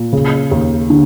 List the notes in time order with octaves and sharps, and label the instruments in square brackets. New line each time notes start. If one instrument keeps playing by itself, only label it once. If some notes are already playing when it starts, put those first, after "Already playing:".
Already playing: [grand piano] A#2
C#3
D#2
[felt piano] D3